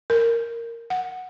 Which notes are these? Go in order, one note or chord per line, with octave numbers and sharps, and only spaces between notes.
A#4
F#5